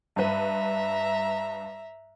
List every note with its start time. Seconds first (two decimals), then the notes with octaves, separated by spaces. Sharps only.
0.16 G2 B4 E5 A#5